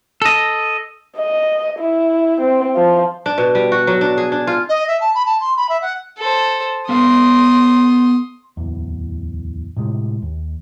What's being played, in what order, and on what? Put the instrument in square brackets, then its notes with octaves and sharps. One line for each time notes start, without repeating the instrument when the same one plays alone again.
[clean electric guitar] A4 D#5
[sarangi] D#5
E4
C4
F3
[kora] D4
B2
G3
F#4
F#3
D4
G#4
D4
F4
[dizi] D#5
E5
A5
B5
A5
C6
B5
E5
F#5
[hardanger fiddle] A4 C5
[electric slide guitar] B3 A4 F5 [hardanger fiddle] C6 D#6
[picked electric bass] D1 E2
A2 C3 G#3
D#2